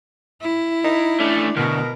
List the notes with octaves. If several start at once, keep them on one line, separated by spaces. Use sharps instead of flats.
E4
D#4
A3 C#4 D4
D2 B2 A#4